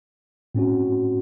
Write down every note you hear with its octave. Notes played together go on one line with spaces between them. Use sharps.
A2 C4 C#4 F#4